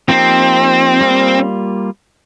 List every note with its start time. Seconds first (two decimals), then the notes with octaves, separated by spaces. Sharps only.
0.09 F3 A#3 C4 D#4 G4
1.01 G3 A#3 F4